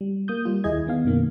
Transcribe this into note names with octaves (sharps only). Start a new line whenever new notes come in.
G3
A#3 D#6 G6
G3 F4
D#2 E4 G#4 D#5 G#6
D#3 B3 F5
F#2 B2 D#3 A#3